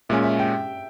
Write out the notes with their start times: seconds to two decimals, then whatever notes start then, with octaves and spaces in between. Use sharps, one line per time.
0.09 A#2 G#3 C#4 E5
0.24 E5
0.39 G5